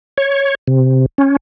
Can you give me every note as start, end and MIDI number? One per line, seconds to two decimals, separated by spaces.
0.18 0.55 73
0.68 1.06 48
1.18 1.36 61